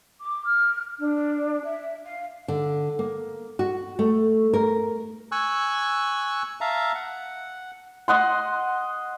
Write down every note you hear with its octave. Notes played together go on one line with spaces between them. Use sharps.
D6
F6
D4
E5
F5
D3
A#3
F#4
A3
A#4
G#5 C#6 E6 F#6
E5 F5 A5 A#5
F#5
D#5 F#5 C6